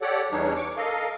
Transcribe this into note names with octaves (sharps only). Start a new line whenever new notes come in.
G4 A4 C#5 D5 F#5
E2 E3 G3 D4 D#4 C#5
C#6 D6
A4 A#4 D#5 F5